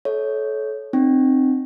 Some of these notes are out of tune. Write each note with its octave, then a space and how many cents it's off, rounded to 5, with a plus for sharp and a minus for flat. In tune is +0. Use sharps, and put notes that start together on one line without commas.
A4 -25 C#5 +0 E5 -40
C4 +0 D#4 -35 G5 +0